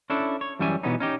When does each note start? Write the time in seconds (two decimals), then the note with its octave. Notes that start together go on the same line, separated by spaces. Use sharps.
0.10 C#4 D4 E4 A4
0.41 C#5
0.59 F#2 E3 G3 C#4 E5 G#5
0.83 B2 E3 G3 B3 C#4 D#4
1.00 C#4 D#4 G4